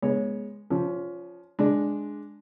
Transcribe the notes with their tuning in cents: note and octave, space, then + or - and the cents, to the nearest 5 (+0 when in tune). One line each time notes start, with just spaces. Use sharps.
G#3 +0 B3 -30 C#5 +0
F3 +5 C#4 +20
G#3 +5 D4 +0